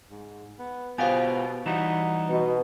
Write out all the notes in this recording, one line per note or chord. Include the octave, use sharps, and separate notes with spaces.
G#2
B3
B2 B3 F4 G4 C5 F5 G#5
E3 G3 D#4 F#4 E7
B2